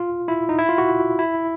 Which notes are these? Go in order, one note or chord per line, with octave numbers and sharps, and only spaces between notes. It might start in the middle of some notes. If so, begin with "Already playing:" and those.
Already playing: F4
E4
D#4
E4
F4
F#4
E4